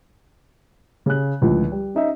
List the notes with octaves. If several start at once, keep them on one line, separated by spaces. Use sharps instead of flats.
C#3 F#6
C#2 A2 D3 F3
G3
C#4 D#4 E5